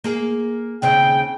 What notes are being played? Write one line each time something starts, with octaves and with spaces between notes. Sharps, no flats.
A#3 G#4
D#2 C#3 C4 G5